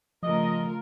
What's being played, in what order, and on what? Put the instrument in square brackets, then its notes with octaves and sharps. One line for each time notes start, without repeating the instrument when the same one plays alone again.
[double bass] C#3 A3 [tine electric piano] F3 [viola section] F4 A#4 [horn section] D#5